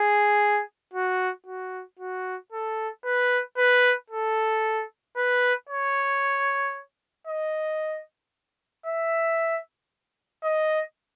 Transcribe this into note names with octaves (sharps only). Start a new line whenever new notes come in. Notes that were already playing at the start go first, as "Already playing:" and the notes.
Already playing: G#4
F#4
F#4
F#4
A4
B4
B4
A4
B4
C#5
D#5
E5
D#5